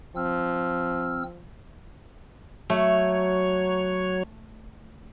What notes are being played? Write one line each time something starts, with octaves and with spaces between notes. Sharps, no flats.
F3 C4 E6 F6
F#3 A3 C#5